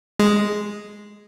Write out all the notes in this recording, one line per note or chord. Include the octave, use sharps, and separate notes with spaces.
G#3